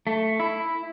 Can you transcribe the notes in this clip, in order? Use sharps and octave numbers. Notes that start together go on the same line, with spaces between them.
A3
E4